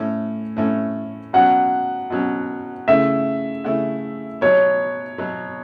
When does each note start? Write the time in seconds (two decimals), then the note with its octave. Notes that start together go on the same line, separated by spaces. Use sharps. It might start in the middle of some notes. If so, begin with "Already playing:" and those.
Already playing: A2 A3 C#4
0.57 A2 A3 C#4
1.33 B2 F#3 C#4 F#5
2.10 B2 F#3 C#4
2.88 C#3 A3 E4 E5
3.64 C#3 A3 E4
4.41 B2 F#3 B3 C#5
5.18 B2 F#3 B3